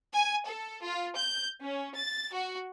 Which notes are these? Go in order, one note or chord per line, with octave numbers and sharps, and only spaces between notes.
G#5
A4
F4
G6
C#4
A6
F#4